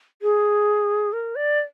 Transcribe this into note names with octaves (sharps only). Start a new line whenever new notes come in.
G#4
A#4
D5